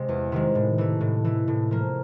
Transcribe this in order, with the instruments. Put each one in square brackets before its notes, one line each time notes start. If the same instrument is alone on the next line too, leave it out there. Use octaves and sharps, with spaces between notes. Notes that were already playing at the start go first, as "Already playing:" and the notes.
Already playing: [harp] C3 G#3 C4
E2
C3 D#3 G#3
A2
E3 A3
A2
E3 A3
A2
F3 A#3